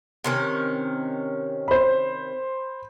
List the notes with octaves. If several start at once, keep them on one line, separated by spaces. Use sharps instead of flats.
C3 D#3 C#4
C5 B5